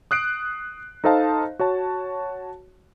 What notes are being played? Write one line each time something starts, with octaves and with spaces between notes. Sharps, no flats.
D#6 F#6 C7 D7
D#4 A4 C5 D#5 F5 A5
F#4 C#5 A5